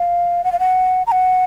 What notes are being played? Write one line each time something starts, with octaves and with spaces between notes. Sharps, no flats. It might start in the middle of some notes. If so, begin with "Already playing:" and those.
Already playing: F5
F#5
F5
F#5
A#5
F#5